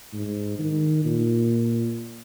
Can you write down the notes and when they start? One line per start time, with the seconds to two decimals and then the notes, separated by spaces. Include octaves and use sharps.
0.13 G#2
0.59 D#3
1.05 A#2